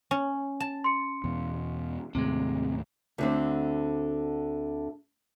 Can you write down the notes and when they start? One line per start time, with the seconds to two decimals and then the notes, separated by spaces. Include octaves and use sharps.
0.11 C#4
0.60 A5
0.84 C6 C#7
1.24 E2 B2
2.15 D#2 A2 C3 G#3
3.18 D2 D3 C4